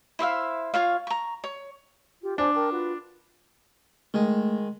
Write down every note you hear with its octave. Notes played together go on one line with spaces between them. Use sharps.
E4 C5 E5 F5
F4 C#5 F5
A#5 C#6
C#5
F4 G4
D4 C5 G#5
A#4 G5 A5
F4 F#4 B4
D#3 G#3 A3